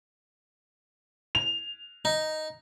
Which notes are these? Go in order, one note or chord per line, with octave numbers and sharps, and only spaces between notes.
F7
D#4